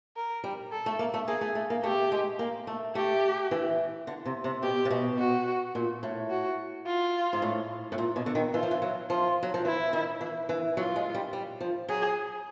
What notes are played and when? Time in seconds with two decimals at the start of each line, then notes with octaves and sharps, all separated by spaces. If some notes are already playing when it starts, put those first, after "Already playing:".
0.17 A#4
0.44 G3
0.72 A4
0.86 A3
0.99 A#3
1.14 A3
1.28 A#3 G#4
1.41 A3
1.55 A3
1.70 A#3
1.84 A3 G4
2.12 G#3
2.39 A#3
2.67 A3
2.95 A3 G4
3.51 E3
4.07 D3
4.26 C3
4.44 C3
4.63 B2 G4
4.85 C3
4.91 B2
5.18 F#4
5.75 A#2
6.03 A2
6.30 F#4
6.86 F4
7.33 G#2
7.42 A2
7.92 A2
7.98 A#2
8.16 B2
8.26 D3
8.35 D#3
8.54 E3 F4
8.63 F3
8.71 E3
8.82 F#3
9.10 F3 F4
9.43 F#3
9.54 F3
9.65 E3 E4
9.93 D#3
10.21 E3
10.49 E3
10.77 F#3 F4
10.96 G#3
11.14 G3
11.33 G3
11.61 F3
11.89 F#3 G#4